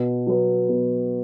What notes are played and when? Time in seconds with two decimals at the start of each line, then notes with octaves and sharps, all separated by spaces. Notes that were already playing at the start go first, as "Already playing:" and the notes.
Already playing: B2
0.27 F#3 B3
0.69 B2